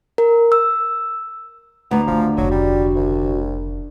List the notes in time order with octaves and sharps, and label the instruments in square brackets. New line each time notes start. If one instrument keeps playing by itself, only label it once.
[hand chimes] A#4
E6
[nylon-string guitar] D2 [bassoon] B3 [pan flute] A#5
[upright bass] C#3 A3 [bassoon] F3
[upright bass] F1 C#3 [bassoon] F#3 [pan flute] F#4
[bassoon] G3
C2